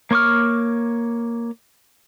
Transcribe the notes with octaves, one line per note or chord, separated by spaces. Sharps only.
A#3 C#5 C#6 D6 F6